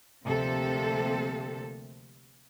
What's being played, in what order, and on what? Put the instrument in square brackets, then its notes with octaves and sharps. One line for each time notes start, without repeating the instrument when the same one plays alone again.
[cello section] D2 C3 F3 A#3 A4